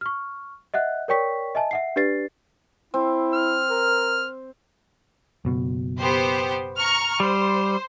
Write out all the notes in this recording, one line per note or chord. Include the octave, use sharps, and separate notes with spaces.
C#6 F6
D#5 E5 F#5 F#6
A#4 C#5 D5 G5 C#6 B6
D#5 E5 G#5 A5
E5 F#5 C7
D4 G4 B4 D5 A6 C7
C4 E4
F6
A#4
F#1 B2
B3 G4 C5
A#5 C#6 F6
G3 C5